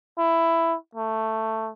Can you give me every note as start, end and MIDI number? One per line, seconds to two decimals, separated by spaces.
0.18 0.76 64
0.95 1.71 57